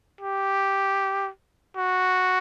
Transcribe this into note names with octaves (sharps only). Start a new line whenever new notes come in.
G4
F#4